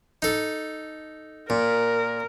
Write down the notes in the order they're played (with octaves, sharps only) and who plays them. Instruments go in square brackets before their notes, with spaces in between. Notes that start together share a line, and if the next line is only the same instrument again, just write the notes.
[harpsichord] D#4 A4
[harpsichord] A#2 [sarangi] A#4